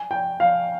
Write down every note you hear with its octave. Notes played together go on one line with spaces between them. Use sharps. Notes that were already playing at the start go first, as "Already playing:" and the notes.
Already playing: G#5
G5
F5